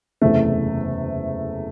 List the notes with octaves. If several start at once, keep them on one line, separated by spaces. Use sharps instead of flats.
F#1 E2 C3 A3